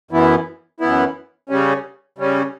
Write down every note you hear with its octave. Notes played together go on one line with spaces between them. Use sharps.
F#2 E3 B3 E4
F#2 E3 B3 E4
C#3 G3 C#4
C#3 G3 C#4